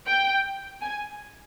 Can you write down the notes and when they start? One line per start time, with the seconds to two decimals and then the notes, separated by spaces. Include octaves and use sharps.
0.08 G5
0.82 G#5